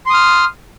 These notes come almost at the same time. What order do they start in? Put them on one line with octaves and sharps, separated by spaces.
C6 D#6 F6